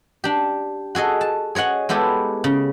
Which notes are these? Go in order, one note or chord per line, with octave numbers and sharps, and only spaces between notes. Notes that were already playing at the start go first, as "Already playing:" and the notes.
D4 G4
F#4 G#4 A4 D#5
A5
G#4 C#5 D#5 F#5 G#5
G#3 B3 E4 G4 A4
C#3